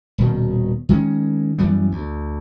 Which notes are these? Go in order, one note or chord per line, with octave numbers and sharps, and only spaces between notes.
D#1 B2 D#3
D#3 G#3 C4 C#4
F#2 E3 G3 B3
D2